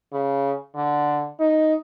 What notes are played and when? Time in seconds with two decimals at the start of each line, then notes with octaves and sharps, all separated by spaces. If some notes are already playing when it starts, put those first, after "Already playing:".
0.12 C#3
0.75 D3
1.40 D#4